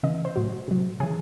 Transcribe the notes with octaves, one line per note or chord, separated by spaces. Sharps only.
C#3 E3 D#5
C5
A2 F#3
C3 F#3
C#3 E3 G#4